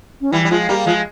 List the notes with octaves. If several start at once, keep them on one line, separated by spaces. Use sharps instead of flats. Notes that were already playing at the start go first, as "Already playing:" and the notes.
C#4
E3 G3 E4
G3
F3 G#3 F4
G3 A#3 G4
F3 G#3 F4